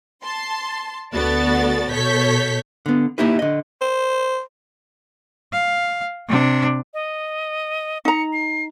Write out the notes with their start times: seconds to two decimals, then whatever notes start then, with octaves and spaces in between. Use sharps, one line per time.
0.23 A5 C6
1.14 D2 B3 F#4 A4 D5 A6
1.92 B2 A4 C#5 G6 B6
2.86 D3 B3
3.18 A#3 D#4 E4 G4 B4
3.39 D3 D#5
3.81 C5
5.53 F5
6.28 C3 D4
6.94 D#5
8.05 D#4 A#5 C#7
8.33 C7